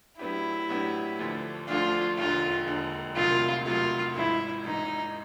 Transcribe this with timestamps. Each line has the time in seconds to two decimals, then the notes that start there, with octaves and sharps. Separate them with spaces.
0.19 A2 F#3 B3 D4 E4 G4
0.69 A2 F#3 B3 D4 G4
1.19 D2 D3 F3 A3 D4
1.68 D2 D3 F3 A3 D4 F4
2.18 E1 D#2 D3 F4
2.67 E1 D#2 D3
3.16 C2 C3 D#3 F#3 A3 F4
3.66 C2 C3 D#3 F#3 A3 F4
4.16 G#1 G#2 E3 E4
4.65 G#1 G#2 E3 D#4